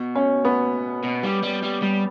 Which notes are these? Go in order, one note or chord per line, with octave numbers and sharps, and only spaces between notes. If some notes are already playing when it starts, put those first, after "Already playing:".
Already playing: B2
C#4
B3
B2
G3
G3
G3
G3